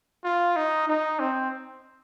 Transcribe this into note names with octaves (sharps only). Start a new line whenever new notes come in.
F4
D#4
D#4
C4